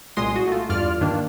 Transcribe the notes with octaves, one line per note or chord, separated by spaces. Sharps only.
C2 A#2 G#3 C6 D#6
F#4
A3 F4
E2 G2 F4 D5 F6
G2 D#3 A#3 D4